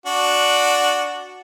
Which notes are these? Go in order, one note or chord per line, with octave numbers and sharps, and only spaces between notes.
D4 F#4